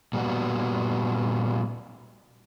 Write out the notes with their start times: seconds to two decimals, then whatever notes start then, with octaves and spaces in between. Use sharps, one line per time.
0.13 A#2 G3 B3 F#4